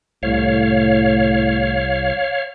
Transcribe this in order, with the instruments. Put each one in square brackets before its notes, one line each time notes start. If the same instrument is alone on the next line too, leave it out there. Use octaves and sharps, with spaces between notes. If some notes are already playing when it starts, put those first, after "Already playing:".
[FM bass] C2 [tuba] A2 [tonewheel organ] C#5 F5